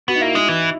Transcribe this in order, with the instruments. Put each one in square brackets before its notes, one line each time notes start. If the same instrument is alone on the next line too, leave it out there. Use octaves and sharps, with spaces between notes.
[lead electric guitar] B3 [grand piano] F#4
[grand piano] D#4
[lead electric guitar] A#3 [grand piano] E4
[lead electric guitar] G#3 [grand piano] D#4
[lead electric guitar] E3 [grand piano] E4